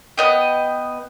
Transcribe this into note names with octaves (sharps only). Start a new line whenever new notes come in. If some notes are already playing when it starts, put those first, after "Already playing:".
B3 D#5 G5